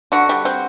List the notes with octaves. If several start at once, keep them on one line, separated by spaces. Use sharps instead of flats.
D3 F#4
G3
C4